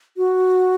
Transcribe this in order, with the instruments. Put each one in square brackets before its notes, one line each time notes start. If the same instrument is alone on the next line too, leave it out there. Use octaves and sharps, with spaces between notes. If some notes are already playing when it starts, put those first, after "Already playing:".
[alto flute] F#4